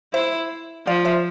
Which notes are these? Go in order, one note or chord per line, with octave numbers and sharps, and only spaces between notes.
E4 C5 E5
F3 D5 F5
C5 E5